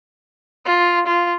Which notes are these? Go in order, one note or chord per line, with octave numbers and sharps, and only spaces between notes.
F4
F4